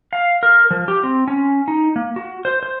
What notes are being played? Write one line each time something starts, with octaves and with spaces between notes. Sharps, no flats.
F5
A#4
F3
G4
C4
C#4
D#4
A#3
F#4
C5
C5